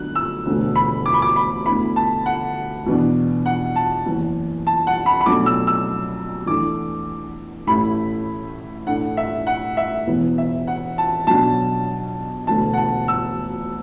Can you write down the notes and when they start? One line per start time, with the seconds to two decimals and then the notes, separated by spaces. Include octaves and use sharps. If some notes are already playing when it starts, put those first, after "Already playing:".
Already playing: D2 D3 F#3 B3 F#6
0.15 E6
0.46 E1 D2 D3 A3
0.76 B5
1.06 D6
1.14 B5
1.22 D6
1.36 B5
1.66 D2 D3 B3 E4 B5
1.96 A5
2.26 F#5
2.86 E2 B2 B3 D4
3.46 F#5
3.76 A5
4.06 F#1 E2 E3
4.67 A5
4.87 F#5
5.06 B5
5.21 B5
5.26 B1 B2 F#3 A3 D4 D6
5.46 E6
5.67 E6
6.46 E2 E3 A3 D4 D6
7.67 A1 A2 A3 E4 B5
8.87 A2 A3 D4 F#5
9.17 E5
9.47 F#5
9.77 E5
10.07 E1 E2 E3 B3
10.38 E5
10.67 F#5
10.98 A5
11.27 B1 B2 F#3 D4 A5
12.47 E1 D2 D3 A3 A5
12.73 F#5
12.77 A5
13.08 E6